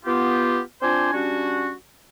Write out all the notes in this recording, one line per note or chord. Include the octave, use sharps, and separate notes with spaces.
B3 F4 G4
C4 D4 F4 C5 D5 G#5
G3 C#4 D4 F#4